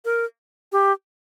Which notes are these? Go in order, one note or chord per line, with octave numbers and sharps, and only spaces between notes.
A#4
G4